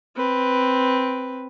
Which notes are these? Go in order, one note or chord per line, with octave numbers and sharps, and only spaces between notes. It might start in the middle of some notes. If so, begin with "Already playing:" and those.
C4 B4